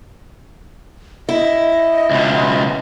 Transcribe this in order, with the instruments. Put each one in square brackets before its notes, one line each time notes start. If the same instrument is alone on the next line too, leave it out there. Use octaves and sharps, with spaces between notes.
[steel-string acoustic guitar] E4 [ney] D#5
[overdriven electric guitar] C#2 B2